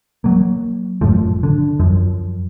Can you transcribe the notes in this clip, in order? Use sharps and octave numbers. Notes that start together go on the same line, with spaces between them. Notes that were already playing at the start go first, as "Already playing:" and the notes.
F#3 A#3
G1 F#2 A2 F3
D3
F#2 F3